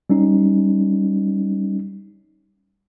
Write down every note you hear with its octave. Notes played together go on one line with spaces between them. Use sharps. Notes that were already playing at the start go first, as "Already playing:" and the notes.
G3 C#4 D#4